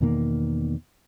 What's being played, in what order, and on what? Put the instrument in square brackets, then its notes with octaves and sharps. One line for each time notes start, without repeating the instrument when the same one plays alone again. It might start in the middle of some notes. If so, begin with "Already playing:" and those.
[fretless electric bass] E2 B2 D#3 A#3